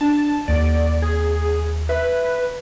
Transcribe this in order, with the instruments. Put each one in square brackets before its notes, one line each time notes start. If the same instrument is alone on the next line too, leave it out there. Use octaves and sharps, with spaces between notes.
[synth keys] D4 [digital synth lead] A5
[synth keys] D#2 [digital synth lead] D5
[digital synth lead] G#4
[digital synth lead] B4 [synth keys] E5